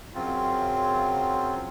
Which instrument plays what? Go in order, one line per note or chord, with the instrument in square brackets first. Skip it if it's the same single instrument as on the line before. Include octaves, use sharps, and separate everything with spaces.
[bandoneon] F#2 C#3 F#3 C4 F4